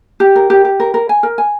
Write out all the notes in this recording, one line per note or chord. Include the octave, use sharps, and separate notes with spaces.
G4
A#4
G4
G4
A#4
A#4
G#5
A#4
G#5